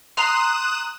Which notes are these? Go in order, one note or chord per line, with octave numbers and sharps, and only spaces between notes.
A#5 C6 D#6 F#6 E7